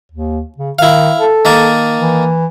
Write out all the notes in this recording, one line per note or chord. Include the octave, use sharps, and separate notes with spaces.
D#2
C#3
D#3 E4 F5
A4
D#3 A#3 A5
E3